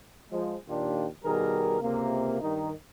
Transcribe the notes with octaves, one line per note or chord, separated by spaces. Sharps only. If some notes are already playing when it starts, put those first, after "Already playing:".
F3 G#3
D#2 A#2 D#3 D4 F4 G4
B2 D#3 G3 G#4 A#4
C#2 C3 A#3
G2 D#3 D#4